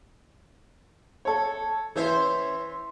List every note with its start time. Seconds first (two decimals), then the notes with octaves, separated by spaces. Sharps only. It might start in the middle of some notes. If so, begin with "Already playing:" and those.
1.25 A4 C#5
1.96 E3 C#4 C5 C#5 E5